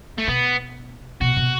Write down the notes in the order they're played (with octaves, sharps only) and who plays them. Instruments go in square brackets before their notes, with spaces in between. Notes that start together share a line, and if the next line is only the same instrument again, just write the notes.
[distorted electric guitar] A3
[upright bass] B2 [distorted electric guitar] B3
[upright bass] B2 [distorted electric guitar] F#4
[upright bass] B2